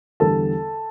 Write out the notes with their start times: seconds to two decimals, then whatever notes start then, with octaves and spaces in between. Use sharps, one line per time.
0.20 E2 D3 G3 A4 A5